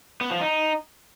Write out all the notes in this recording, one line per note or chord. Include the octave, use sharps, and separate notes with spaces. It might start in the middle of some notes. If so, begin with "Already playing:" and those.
B3
F3
D#4